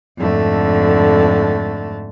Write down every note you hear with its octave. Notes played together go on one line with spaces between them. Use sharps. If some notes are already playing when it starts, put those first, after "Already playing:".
F2 G#2 D3 A3